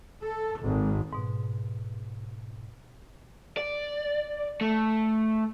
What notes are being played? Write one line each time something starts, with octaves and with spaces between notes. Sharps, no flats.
A4
G#1
G#2 B2
D5
A3